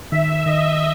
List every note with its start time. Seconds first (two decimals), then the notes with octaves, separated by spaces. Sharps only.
0.12 D#3 E5
0.46 D#3 D#5